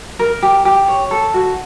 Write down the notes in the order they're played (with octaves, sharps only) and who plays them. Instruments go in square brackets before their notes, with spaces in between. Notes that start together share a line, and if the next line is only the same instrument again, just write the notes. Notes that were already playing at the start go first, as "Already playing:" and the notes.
[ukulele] A#4
G4
G4
C#5
A4
F#4